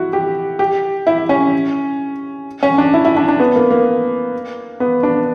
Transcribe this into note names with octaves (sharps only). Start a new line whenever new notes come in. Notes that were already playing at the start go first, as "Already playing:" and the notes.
Already playing: E4 F#4
G4
G4
E4
C#4
C#4
D4
E4
E4
D4
D4
B3
A#3
A#3
B3
D4